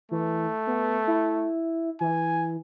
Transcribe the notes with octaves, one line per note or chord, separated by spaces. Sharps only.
E3 A3
B3
E4
E3 G#5